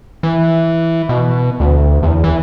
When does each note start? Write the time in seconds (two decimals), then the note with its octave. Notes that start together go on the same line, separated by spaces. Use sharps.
0.23 E3
1.09 B2
1.60 D2
2.03 E2
2.24 E3